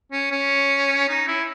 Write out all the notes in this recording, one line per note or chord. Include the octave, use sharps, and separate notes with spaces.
C#4
C#4
D#4
E4